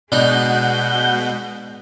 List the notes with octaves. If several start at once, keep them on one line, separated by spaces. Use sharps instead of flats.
B2 G#3 D4 D#4 F#5 G6